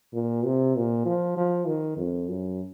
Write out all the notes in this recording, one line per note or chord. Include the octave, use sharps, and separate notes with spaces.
A#2
C3
A#2
F3
F3
D#3
F2
F#2